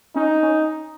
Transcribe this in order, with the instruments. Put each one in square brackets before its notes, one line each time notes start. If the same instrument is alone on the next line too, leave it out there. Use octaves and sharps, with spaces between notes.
[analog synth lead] C#4 [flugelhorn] D#4
[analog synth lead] C#4